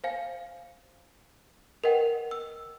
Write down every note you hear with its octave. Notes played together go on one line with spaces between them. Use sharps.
C5 F5 G#5
A#4 B4 D#5 F#5 G5
E6